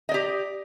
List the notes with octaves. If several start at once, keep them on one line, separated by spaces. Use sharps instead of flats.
G4 D5 D#5